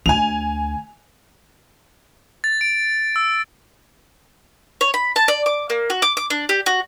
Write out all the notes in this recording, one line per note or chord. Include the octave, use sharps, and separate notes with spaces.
D2 D3 G#5 F7
A6
D7
E6
C#5
B5
A5
D5
D6
A#3
F#4
D6
D6
D4
G4
F#4